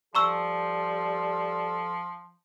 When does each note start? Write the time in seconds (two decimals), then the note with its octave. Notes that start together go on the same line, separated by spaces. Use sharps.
0.15 F3 G3 A4 A#5 C#6 E6